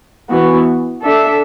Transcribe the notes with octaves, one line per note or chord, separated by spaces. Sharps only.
E3 B3 F#4
D4 A4 E5